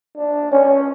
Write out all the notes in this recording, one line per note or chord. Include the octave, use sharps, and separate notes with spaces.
D4
C#4